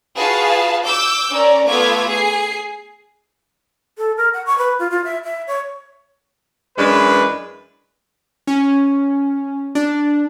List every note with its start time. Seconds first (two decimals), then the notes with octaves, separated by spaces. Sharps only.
0.17 F4 F#4 G#4 B4 F5 A5
0.83 D6 E6 G6
1.33 C#4 A#4 D5
1.68 A3 B3 F4 D6 E6 G#6
2.09 G#4 C7
3.98 A4
4.17 A#4
4.34 F#5
4.46 C#6
4.58 B4
4.79 F4
4.91 F4
5.04 E5
5.24 E5
5.47 C#5
6.76 F#2 E3 G#3 D4 B4
8.47 C#4
9.75 D4